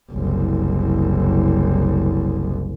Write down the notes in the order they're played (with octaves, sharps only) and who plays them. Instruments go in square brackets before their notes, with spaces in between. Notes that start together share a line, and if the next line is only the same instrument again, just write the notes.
[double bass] F#1 C2